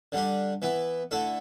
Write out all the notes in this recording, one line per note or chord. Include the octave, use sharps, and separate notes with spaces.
D3 G3 D4 G4
E3 B3 E4
D3 A3 E4 A4